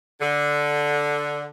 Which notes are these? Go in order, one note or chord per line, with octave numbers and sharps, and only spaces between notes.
D3